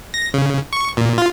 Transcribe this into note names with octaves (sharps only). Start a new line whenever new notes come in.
A#6
C#3
C#6
A#2
F4